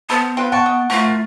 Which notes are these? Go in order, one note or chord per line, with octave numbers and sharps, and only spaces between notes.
B3 A4 B4 C5
C4 F4 B4 G5
F#5 G5 A5 C#6
D#5
F3 A3 F4 A#4 C#6